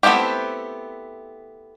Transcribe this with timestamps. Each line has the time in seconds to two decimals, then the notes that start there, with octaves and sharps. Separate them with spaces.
0.03 A3 B3 C4 E4 G4